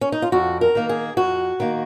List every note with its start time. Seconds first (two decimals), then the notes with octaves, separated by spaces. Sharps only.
0.01 C#4
0.12 D#4
0.22 F4
0.32 F2 F#4
0.61 A#4
0.75 D#3 A#3
0.89 G#4
1.17 F2 F#4
1.60 D#3 A#3